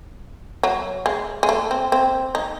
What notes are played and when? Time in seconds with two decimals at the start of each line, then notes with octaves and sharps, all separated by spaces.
0.63 F#3
1.06 G#3
1.43 G#3
1.49 A3
1.71 C4
1.92 C4
2.35 D#4